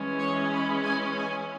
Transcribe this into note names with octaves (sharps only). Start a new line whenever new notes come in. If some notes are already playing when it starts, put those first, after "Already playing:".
Already playing: E3 G#3 C#4
C#5
B5
G#5
G#5